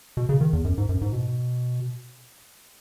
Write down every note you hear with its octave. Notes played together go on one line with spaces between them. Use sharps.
B2
C#3
D#3
E2
F#2
G#2
F#2
G#2
B2